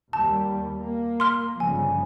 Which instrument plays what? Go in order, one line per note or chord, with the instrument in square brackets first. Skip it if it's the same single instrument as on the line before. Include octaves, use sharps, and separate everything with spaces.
[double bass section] D#2 G3 [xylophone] A5
[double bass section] A#3
[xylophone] C6 F6
[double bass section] G1 C#3 F3 [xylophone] G#5